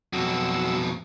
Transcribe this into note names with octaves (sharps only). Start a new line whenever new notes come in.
F2 B2 F#3 E6